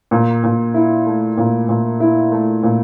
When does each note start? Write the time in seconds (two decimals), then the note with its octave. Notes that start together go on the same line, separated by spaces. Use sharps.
0.11 A#2
0.44 A#2
0.74 E4
1.06 A3
1.38 A#2
1.69 A#2
2.00 E4
2.32 A3
2.63 A#2